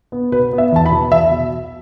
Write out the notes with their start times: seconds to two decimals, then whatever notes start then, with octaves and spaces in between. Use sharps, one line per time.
0.12 B3
0.32 B2 B4
0.53 B3
0.58 E5
0.72 E2 A5
0.86 B5
0.91 B2 B3
1.11 E2 E5
1.31 B2